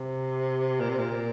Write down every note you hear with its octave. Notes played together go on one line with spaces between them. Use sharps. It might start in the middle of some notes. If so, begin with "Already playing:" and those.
Already playing: C3
A#2
C3
A#2